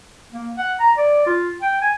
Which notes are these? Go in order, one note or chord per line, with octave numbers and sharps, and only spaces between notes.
A#3
F#5
A#5
D5
F4
G5
G#5